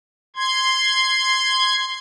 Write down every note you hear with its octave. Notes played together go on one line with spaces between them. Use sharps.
C6 G#6